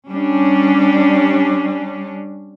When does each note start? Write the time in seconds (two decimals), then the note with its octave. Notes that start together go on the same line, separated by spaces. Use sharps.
0.11 G3 C#4 D4